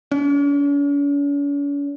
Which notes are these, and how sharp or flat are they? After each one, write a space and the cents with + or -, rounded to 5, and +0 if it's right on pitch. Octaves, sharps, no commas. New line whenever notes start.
C#4 +45